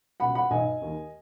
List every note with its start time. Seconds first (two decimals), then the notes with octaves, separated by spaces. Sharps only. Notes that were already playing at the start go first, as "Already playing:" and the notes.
0.20 C#2 B2 F#5 B5
0.35 F#5 B5
0.51 B1 B2 D#5 G#5
0.82 D#2 D#3